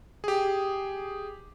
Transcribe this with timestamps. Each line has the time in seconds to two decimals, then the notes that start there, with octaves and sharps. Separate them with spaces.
0.24 G4 G#4